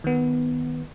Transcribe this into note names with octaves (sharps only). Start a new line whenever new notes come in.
D#3 B3